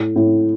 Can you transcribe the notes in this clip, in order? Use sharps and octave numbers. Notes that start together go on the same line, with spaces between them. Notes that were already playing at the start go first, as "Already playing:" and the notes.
Already playing: A2
A2